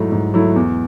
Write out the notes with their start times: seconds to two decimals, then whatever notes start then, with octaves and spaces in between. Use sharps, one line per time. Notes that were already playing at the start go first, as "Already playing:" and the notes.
Already playing: G#2 F#3 A3 E4
0.12 G#2
0.34 F#3 A3 E4
0.56 E2